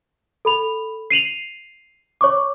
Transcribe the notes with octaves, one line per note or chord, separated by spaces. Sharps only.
A4 B5 F7
C7 D#7 F7 F#7
C#5 C#6 D6